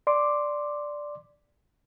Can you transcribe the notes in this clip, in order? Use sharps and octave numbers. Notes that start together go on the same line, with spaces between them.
D5 C6 D6